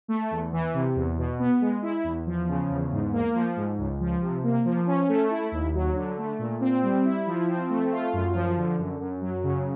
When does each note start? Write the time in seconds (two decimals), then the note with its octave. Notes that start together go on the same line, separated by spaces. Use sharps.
0.08 A3
0.31 E2
0.52 E3
0.74 C3
0.95 E2
1.17 B2
1.39 B3
1.61 G#3
1.82 E4
2.04 E2
2.27 F3
2.48 C#3
2.70 E2
2.92 G#2
3.13 A#3
3.34 F3
3.56 G#2
3.78 C#2
4.00 F3
4.21 C3
4.43 A#3
4.65 F3
4.87 C#4
5.09 A3
5.31 E4
5.52 D#2
5.74 F#3
5.95 D3
6.18 A3
6.39 A#2
6.61 C4
6.83 G3
7.05 E4
7.27 F3
7.48 C4
7.70 A3
7.92 F4
8.13 F#2
8.35 F3
8.57 D3
8.78 F#2
9.00 F#2
9.21 F#3
9.43 C#3